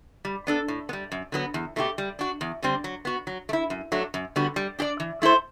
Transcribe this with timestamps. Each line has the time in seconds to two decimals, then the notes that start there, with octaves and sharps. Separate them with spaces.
0.25 G3
0.47 B3 D4 A4
0.68 A2
0.89 B3
0.93 G3
1.12 F#2
1.32 D3 F#3 B3
1.54 E2
1.76 B2 A3 E4 G4
1.98 G3
2.19 D4 F#4
2.41 E2
2.63 D3 G3 C4
2.84 F#3
3.05 B3 F#4
3.27 F#3
3.49 A3
3.53 E4
3.70 F#2
3.92 F#3 A3 D4
4.14 F#2
4.36 D3 G3 B3 F#4
4.56 G3
4.79 D4 G4 D5
5.00 E3
5.22 A3 E4 A4 C5